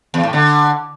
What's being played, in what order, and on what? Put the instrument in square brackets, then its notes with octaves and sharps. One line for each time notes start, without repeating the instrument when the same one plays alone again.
[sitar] E2
A2
D3